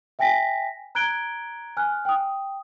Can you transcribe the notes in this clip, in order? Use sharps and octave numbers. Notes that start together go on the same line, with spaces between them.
E5 G5 G#5 A#6 B6
A#5 F#6 G#6 D7 G7
G#5 F6 F#6
G5 D#6